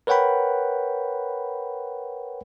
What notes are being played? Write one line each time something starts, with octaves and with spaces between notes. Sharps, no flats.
A#4 B4 C#5 F#5 G5 B5